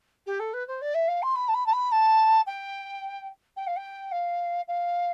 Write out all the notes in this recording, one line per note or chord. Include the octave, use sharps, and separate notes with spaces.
G4
A4
B4
C5
D5
E5
F5
C6
B5
A5
B5
A5
B5
A5
G5
G5
F5
G5
F5
F5